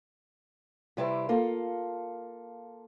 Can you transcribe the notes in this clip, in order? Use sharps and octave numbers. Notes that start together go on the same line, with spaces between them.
C3 G3 E4 G4 B4 C5
A#3 F4 A4